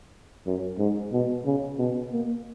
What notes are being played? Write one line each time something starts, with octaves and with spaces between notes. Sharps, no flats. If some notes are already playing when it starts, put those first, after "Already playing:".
F#2
G#2
B2
C#3
B2
A#3